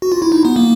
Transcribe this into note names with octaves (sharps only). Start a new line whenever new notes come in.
F#4
F4
E4
D#4
B3
A#3